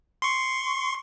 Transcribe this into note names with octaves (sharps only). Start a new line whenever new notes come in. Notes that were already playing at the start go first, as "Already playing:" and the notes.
C6 C#6